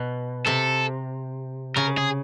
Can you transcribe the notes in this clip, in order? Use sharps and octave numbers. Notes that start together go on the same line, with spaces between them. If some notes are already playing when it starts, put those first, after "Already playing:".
Already playing: B2
C3 A4
C#3 A#4
G#4